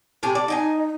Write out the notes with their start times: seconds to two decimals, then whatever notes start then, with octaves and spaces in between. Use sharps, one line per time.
0.23 A2 G4 G#4
0.35 D5
0.48 D#4 D#5 G5 G#5